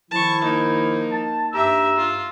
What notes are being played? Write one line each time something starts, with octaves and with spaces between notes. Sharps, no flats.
D#3 F3 E4 A5 C#6
A#3 D#4
A5
G2 G4 E5 A#5 E6
F4